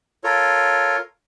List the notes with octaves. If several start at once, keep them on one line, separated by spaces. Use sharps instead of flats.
F4 A4 A#4 C#5